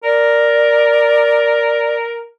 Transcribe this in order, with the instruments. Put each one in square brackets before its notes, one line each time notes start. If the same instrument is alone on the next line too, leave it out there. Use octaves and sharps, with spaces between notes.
[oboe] A#4 [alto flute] D5